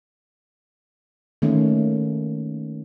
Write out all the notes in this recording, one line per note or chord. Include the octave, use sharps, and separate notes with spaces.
D#3 A3 A#3 C#4